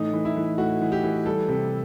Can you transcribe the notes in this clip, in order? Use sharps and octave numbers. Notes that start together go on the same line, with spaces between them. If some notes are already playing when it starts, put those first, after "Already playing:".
Already playing: A2 E3 D#4
E3
E4
E3
A2 F#4
E3
G4
E3
G3 A4
C3